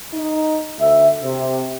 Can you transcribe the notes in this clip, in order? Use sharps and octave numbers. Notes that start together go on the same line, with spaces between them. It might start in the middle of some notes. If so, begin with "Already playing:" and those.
D#4
D2 E5
C3